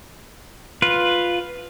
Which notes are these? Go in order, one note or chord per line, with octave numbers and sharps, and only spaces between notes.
F4 B4